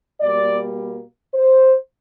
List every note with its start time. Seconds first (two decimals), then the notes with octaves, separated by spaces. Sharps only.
0.20 B2 G3 A#3 D5
1.34 C5